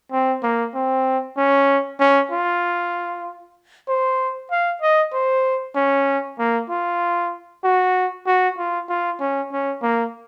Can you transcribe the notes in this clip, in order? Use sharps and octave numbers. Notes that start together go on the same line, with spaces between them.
C4
A#3
C4
C#4
C#4
F4
C5
F5
D#5
C5
C#4
A#3
F4
F#4
F#4
F4
F4
C#4
C#4
A#3